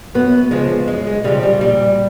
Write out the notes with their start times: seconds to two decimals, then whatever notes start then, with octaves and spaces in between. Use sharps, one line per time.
0.15 F#2 B3
0.51 C#3 F3 G#3
0.88 F#2 G#3
1.07 G#3
1.24 C#3 F3 G3
1.43 G3
1.61 A#2 G3